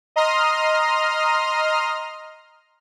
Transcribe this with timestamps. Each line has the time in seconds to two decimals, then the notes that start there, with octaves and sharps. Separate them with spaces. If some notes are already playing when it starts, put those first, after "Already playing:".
0.16 D#5 A#5 C6 D#6 F6